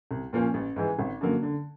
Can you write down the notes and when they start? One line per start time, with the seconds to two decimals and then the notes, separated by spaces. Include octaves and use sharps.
0.11 C2
0.33 A#2 F3 A#3 C#4
0.54 A1
0.76 G#2 E3 G#3
0.99 G#1
1.21 F#2 D3 F#3 A#3
1.43 D3